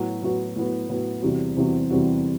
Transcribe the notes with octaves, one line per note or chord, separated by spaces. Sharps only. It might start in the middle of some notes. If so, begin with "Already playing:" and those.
Already playing: A2 F#3 B3 F#4
A2 F#3 B3 F#4
A2 F#3 B3 F#4
A2 F#3 B3 F#4
E2 C3 G3 C4 F#4
E2 C3 G3 C4 F#4
E2 C3 G3 C4 F#4